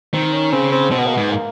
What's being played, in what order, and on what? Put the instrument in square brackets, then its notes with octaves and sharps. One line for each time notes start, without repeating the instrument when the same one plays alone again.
[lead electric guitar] D#3 [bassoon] C4
[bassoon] C#4
[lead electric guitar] C#3 [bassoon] C4
[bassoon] C4
[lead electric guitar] B2 [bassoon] C4
[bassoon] B3
A#3
[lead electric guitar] G#2 [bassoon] B3
[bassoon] A#3